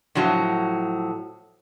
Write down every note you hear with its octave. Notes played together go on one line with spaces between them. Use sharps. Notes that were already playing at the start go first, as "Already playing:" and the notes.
A2 F3 F#3